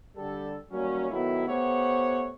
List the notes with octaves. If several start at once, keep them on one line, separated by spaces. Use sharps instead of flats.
D3 G3 G4 A4
D#3 F#3 G3 A#3 C#4
D#3 F#3 A3 B3 E4
A3 B3 G4 C5 C#5 F#5